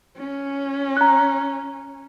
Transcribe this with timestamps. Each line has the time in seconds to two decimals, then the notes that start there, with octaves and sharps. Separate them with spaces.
0.17 C#4
0.97 A#5 F#6